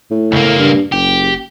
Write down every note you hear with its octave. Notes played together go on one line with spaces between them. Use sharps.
A2
C#2 A#3
G2
F#1 G4